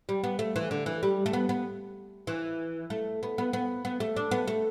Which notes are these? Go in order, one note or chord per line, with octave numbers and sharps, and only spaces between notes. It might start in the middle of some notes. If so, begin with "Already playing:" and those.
G3
B3
A3
E3
D3
E3
G3
A3
B3
B3
E3
A3
B3
B3
B3
B3
A3
D4
B3
A3